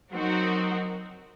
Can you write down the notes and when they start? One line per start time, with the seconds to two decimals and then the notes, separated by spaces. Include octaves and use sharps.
0.11 F#3 C4 D#4 F#4 A#4